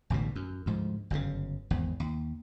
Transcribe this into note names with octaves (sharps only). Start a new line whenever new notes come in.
A1 D2 G#2 B2
F#2
D2 G#2 F3
G1 F#2 A#2 C#3
G#1 E2
D#2